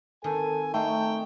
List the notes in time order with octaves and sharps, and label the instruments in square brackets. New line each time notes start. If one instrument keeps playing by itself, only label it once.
[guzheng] D#3 C4 [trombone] A4 [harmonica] G#5
[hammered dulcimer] A3 [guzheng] C4 C5 [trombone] D#4 [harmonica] G5